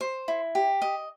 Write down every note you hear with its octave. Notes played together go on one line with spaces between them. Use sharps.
C5
E4
G4
D#5